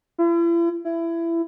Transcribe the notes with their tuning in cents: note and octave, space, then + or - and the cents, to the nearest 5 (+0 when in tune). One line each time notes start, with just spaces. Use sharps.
E4 +45
E4 +20